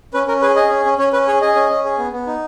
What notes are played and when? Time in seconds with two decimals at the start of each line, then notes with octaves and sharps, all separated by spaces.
0.14 C#4 B4
0.27 C#4 A#4
0.41 G#4 B4
0.56 G#4 D#5
0.70 C#4
0.85 C#4
0.98 C#4 C#5
1.13 C#4 B4
1.27 G#4 C#5
1.41 G#4 D#5
1.55 C#4
1.70 C#4
1.85 G#4
1.98 B3
2.12 B3
2.27 D#4